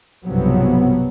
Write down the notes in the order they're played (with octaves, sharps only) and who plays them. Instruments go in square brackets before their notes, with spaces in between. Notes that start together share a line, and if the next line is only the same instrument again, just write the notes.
[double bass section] B1 G2 C3 F3 F#3 B3